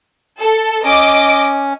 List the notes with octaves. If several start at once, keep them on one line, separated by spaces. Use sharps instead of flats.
A4
C#4 D#5 D6